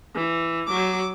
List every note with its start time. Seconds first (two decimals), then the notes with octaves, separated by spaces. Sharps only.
0.15 E3
0.67 F#3 D6